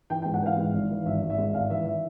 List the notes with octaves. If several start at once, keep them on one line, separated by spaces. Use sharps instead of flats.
E3 G5
G#2 G5
F#5
E3 F5
G#2
G#1
E3
G#1 E5
G#1
E5
G#2
G#1 F5
E3 E5
E3 E5